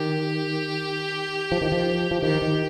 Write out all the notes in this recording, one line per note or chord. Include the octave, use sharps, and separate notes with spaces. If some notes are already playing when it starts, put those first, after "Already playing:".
Already playing: D#3 G4
F3
D#3
F3
F3
D#3 G4
D#3